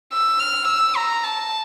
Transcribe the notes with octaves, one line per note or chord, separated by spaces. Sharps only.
E6
F6
E6
A#5
A5